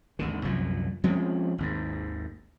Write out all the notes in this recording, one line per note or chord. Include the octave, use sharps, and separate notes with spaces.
G#1 D#2 D3
C2 F#2 A#2 F3
F3 G#3 C4 C#4
G#1 D#2 G#2